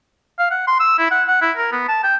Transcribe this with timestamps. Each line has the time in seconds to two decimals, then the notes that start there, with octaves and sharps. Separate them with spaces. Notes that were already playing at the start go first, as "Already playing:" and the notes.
0.39 F5
0.51 F#5
0.67 C6
0.80 E6
0.98 E4
1.11 F#5
1.28 F#5
1.41 E4
1.57 A#4
1.72 B3
1.88 A5
2.04 G5